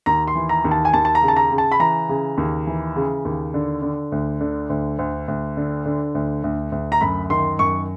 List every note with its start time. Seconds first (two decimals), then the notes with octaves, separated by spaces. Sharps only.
0.06 D#2 A#5
0.27 C6
0.35 E3
0.49 A#5
0.64 D#2
0.71 A5
0.85 G#5
0.94 D#2 A5
1.05 A5
1.15 A#5
1.22 C#3
1.28 A5
1.36 A#5
1.51 C#3
1.58 A5
1.72 B5
1.80 E3 A#5
2.09 C#3
2.37 D#2
2.67 E3
2.96 C#3
3.25 D#2
3.54 D3
3.82 D3
4.12 D2
4.41 D3
4.70 D2
4.99 D2
5.28 D2
5.57 D3
5.86 D3
6.15 D2
6.44 D2
6.72 D2
6.92 A#5
7.01 F#2 B5
7.30 D#3 C6
7.59 F#2 C#6